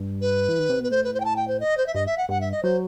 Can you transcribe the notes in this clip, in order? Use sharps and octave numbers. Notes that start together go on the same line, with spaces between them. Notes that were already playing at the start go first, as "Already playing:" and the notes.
Already playing: G2
B4
E3
D#3
C3
B2 B4
A2 C5
B4
C5
G5
A5
G5
C5
D#5
C5
E5
G2 D#5
E5
F#5
G2 F#5
E5
D#5
F#3 C5